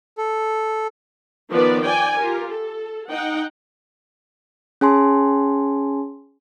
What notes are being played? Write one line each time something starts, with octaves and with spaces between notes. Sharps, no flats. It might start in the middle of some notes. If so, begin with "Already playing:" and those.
A4
D#3 F3 B3 B4 D5
D5 G5 G#5
F4 G4 A#4
A4
D#4 F#5 G5
C#4 G#4 G#5 A5 C6